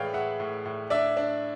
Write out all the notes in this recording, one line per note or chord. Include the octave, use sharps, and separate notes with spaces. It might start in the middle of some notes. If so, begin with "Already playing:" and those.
Already playing: A2 E3 G#3 B4 C#5 D5 F5 G5
G#3 E5 F#5
A2
A2
D4 D5 E5
D4